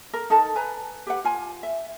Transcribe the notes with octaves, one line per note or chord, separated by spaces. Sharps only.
A#4
D#4 A4 A#4 A5
B4 G#5 A#5
G4 B4 F#5
F4 G#5
E5